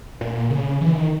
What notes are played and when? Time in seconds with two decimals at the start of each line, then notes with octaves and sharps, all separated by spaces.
0.21 A#2
0.50 C#3
0.81 E3
0.95 D#3